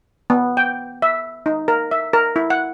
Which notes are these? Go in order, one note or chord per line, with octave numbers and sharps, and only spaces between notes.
B3
G5
E5
D#4
A#4
E5
A#4
E4
F#5